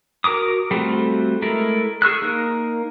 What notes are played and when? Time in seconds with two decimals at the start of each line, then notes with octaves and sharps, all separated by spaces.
0.24 F#4 A#4 A#5 D6 D#6
0.71 G3 A3 C4 F4 F#4
1.42 G#3 A3 E4 A4 A#4
2.02 G#4 C#6 E6 F#6
2.22 A#3 D#4 A#4